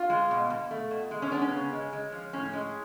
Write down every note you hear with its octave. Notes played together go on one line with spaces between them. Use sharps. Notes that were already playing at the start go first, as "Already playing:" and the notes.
Already playing: F4
G#3
B2
B2
A3
B2
G#3
C#4
B3 D4
C#4
C#3
G#3
G#3
F3
A2 C#4
G#3